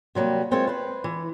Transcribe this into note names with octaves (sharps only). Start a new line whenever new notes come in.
C3 F#3 G3 A#3
G#3 C4 F4 A#4 C#5
B4 C5
E3